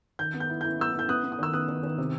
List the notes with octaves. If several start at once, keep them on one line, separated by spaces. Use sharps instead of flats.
D#3 G6
B3
G6
E4
E4 G6
B3 E6 G6
E4
G6
B3 D#6 F#6
B3
D#6
D#3 E6
B3 D#6 F#6
D#3
D#3
C3